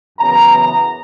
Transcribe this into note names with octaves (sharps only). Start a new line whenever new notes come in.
F#2 C#3 E3 B3 A#5
A#5